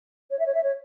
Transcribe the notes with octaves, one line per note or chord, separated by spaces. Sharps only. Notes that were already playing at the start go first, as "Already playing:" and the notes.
C#5
E5
C#5
E5
C#5